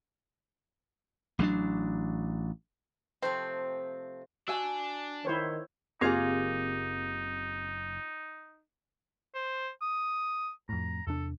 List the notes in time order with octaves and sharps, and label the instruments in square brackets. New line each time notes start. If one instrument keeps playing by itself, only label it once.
[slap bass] A1 F#3 A#3 D4
[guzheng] C3 F3 A3 [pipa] C4
[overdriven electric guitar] D4 [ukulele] F#4 G#5 [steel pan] E6
[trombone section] D#3 [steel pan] E4 C5 C#5
[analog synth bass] F#1 [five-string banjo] A#3 F4 G#4 [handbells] C4 G4 G#6 [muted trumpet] D#4
[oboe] C5
D#6
[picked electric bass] F2 A2 [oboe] A#5
[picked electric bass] E2 C3 D4 [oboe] A4